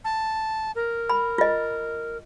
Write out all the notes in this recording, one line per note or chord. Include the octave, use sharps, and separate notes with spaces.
A5
A#4
B5
F4 D#5